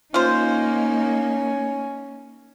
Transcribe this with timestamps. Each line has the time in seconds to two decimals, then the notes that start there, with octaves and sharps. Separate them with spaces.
0.14 A#3 C#4 D#4 F4 C5